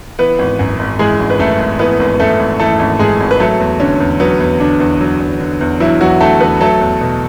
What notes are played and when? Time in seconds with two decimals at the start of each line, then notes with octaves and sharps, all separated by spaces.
0.19 E3 B3 B4
0.39 G#1
0.59 F#2
0.79 G#1
0.99 E3 G#3 G#4
1.19 G#1
1.30 B4
1.39 F#2 A3 A4
1.60 G#1
1.79 E3 B3 B4
2.00 G#1
2.20 F#2 A3 A4
2.40 G#1
2.59 E3 A3 A4
2.79 G#1
2.99 F#2 G#3 G#4
3.20 G#1
3.31 B4
3.40 F#3 A3 A4
3.60 E2
3.80 D3 C#4
4.00 E2
4.20 F#3 B3
4.40 E2
4.60 D3 D4
4.80 E2
5.01 F#3
5.20 E2
5.40 D3
5.61 E2
5.80 E3 F#3 E4
6.01 E2 F#3 F#4
6.21 D3 A3 A4
6.40 E2 B3 B4
6.61 F#3 A3 A4
6.81 E2
7.01 B2